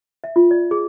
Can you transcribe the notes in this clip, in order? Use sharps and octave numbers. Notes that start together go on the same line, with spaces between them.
E5
F4
D5
G#4